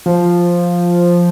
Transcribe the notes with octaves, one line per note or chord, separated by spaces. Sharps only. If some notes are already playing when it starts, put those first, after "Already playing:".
F3